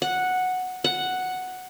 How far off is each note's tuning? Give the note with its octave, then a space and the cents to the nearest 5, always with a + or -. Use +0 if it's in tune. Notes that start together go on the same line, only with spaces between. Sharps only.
F#5 -5
F#5 +0